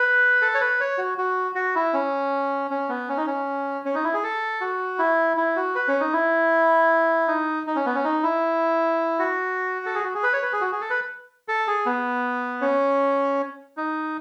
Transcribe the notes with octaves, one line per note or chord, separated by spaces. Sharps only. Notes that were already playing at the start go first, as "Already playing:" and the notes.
Already playing: B4
A4
C#5
B4
C#5
F#4
F#4
F#4
E4
C#4
C#4
B3
C#4
D#4
C#4
C#4
D#4
E4
G#4
A4
F#4
E4
E4
F#4
B4
C#4
D#4
E4
D#4
D#4
C#4
B3
C#4
D#4
E4
F#4
A4
G#4
F#4
G#4
B4
C#5
B4
G#4
F#4
G#4
A4
B4
A4
G#4
B3
C#4
D#4